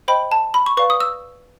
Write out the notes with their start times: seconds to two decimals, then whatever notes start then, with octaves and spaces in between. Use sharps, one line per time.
0.08 C5 D#5 G5 B5
0.31 A5
0.54 B5
0.66 C#6
0.77 B4 D5 F5 C#6
0.90 D#6
1.00 E6